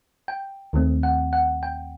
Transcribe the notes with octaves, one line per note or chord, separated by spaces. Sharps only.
G5
D#2 D#3 A3 C4
F#5
F#5
G5